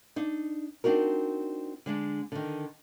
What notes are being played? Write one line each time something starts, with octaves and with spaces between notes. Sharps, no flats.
D4 D#4
C4 D4 D#4 F#4 A#4
D3 G#3 D4
D3 D#3